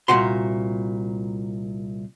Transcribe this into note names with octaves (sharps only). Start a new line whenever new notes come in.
C2 A#2 F#4 C6